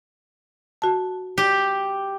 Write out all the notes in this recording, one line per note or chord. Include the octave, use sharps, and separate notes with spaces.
F#4 A5
G4